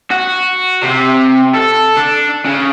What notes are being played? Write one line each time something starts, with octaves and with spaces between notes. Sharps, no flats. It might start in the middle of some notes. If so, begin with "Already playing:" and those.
F#4
C3
A4
D4
C#3